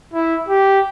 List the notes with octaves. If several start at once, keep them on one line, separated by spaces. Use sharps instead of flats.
E4
G4